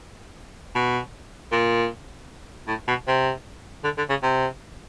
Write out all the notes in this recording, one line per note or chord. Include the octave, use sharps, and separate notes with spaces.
B2
A#2
A2
B2
C3
D3
D3
C#3
C3